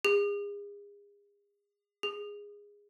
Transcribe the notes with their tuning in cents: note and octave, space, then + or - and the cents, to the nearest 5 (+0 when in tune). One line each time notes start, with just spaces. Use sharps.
G#4 -35
G#4 -15